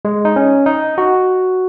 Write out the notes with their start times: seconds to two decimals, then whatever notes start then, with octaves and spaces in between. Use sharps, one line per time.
0.05 G#3
0.25 D#4
0.36 C#4
0.66 D#4
0.98 F#4